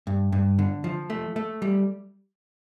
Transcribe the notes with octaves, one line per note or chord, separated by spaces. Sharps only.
G2
G2
D3
F3
A3
A3
G3